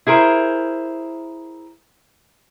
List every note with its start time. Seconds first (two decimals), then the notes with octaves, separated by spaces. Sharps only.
0.07 E4 G#4 A#4 C5